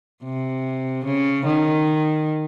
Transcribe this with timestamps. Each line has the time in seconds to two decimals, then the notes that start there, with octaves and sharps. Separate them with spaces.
0.24 C3
1.05 C#3
1.46 D#3